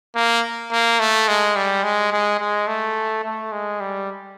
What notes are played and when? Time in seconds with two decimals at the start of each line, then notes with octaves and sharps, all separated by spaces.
0.15 A#3
0.72 A#3
1.00 A3
1.28 G#3
1.56 G3
1.84 G#3
2.12 G#3
2.40 G#3
2.68 A3
3.25 A3
3.52 G#3
3.80 G3